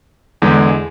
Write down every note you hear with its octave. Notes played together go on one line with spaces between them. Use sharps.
E2 D3 G#3